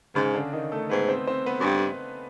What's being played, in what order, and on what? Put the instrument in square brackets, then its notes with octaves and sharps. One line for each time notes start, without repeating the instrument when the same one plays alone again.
[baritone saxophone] G#2 [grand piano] C#3 C#4
[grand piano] D3 D4
D#3 D#4
A3 A4
[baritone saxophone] G#2 [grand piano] B3 B4
[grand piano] C4 C5
C4 C5
B3 B4
[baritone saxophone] F#2
G2